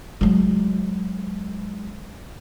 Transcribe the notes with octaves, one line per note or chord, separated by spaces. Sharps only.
F#3 G#3